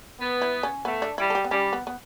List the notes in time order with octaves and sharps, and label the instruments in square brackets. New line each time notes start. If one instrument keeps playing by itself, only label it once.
[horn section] B3
[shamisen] E4
C#4
[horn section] A3 [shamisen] B3
[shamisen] D4
[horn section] G3 [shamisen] E4
[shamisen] A4
G4
B3
[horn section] G3 [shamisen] C#4
[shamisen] B3
B3